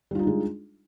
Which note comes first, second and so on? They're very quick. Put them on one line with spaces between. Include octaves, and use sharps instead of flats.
G3 F4 D#4 D4 G#3